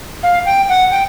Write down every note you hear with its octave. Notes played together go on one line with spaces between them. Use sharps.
F5
G5
F#5
G5